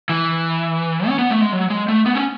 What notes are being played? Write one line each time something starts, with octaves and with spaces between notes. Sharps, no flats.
E3
C#4
B3
A3
G#3
F#3
G#3
A3
B3
C#4